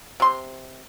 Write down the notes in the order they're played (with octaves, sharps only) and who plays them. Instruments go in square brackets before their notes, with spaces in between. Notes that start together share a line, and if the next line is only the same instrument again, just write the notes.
[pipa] C3 C6